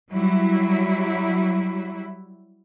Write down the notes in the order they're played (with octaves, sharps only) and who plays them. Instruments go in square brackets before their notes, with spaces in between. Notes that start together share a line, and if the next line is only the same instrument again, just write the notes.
[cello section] F#3 G3 E4